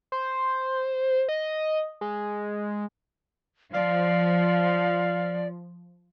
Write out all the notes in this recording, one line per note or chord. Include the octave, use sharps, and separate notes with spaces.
C5
D#5
G#3
F3 D5 F5